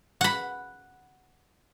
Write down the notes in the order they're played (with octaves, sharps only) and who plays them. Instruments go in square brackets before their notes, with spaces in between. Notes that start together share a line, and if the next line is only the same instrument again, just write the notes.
[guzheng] F#5 B5